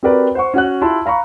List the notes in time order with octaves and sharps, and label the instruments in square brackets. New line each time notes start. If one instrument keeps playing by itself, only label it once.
[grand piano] C4 F#4 G4 A#4 B4 D5
C5 F#5 C#6
C#4 F#4 F#5 F#6
E4 F4 G4 A5 C6
F5 A#5 B5 C#6